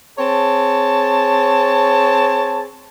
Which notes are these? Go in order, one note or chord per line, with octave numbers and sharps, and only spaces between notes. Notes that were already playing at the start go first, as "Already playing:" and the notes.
C4 G#4 C#5 A5